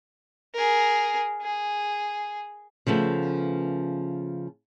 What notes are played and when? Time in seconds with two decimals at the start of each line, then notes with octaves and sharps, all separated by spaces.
0.55 G#4 A#4
1.42 G#4
2.86 C#3 F3 A3 B3